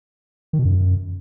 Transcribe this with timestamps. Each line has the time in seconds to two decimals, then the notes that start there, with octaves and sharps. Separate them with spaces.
0.53 D#3
0.59 B2
0.65 F#2